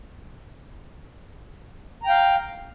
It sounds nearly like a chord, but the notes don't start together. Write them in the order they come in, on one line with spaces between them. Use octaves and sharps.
A#5 G5 F5